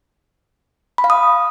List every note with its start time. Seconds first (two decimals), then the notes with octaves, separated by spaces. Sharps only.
0.98 B5
1.04 F5
1.10 D#6